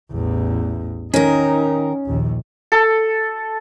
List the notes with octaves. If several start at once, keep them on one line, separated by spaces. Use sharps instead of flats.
A1 E2
D#3 C#4 D#4 A#4
A#1 D#2
A4